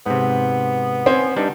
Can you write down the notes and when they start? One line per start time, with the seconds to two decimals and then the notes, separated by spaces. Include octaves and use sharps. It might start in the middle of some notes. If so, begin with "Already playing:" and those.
0.06 G#2 C3 B3
1.06 C4 C#4 G#5
1.36 G2 G3 D4 D#4